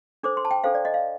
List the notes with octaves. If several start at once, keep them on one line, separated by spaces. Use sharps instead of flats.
D4 A4 C5 D6
C6
A5
G5
D4 A4 C5 F5
D5
D#5
F5